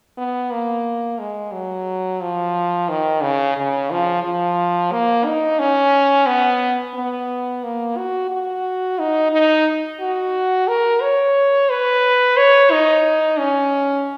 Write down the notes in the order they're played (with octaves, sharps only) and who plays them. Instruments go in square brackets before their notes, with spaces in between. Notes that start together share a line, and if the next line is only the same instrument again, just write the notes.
[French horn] B3
A#3
G#3
F#3
F3
D#3
C#3
C#3
F3
F3
A#3
D#4
C#4
B3
B3
A#3
F#4
F#4
D#4
D#4
F#4
A#4
C#5
B4
C#5
D#4
C#4